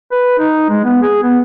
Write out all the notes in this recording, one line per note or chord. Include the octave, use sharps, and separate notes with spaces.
B4
D#4
G#3
B3
G#4
B3